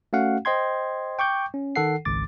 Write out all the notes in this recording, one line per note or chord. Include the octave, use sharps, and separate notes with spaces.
A3 C#4 F#4 F5 F#5
C5 D#5 G5 C6 G#6
G5 C#6 D6 G6
C#4
D#3 A4 F#5 C7
G#1 C#2 D6 A6